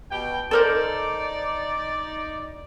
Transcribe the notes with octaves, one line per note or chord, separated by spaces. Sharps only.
B2 G5
D#4 A4 A#4 C5 D5